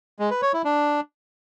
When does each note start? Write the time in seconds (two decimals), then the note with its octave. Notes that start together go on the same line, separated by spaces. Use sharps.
0.19 G#3
0.31 B4
0.42 C#5
0.53 E4
0.65 D4